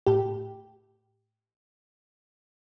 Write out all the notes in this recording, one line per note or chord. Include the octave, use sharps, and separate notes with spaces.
A2 G4